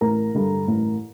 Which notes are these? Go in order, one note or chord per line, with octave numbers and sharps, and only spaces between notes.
A1 A#4 A#5
G2 D3
A1